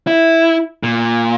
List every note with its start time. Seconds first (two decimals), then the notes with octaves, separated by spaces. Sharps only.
0.07 E4
0.83 A#2